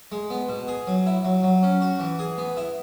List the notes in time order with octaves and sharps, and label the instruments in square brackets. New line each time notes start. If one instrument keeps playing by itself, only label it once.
[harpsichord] G#3
B3
B2
G#4
F#3
E4
F#3
F#3
C#4
F#4
E3
G#4
B3
E4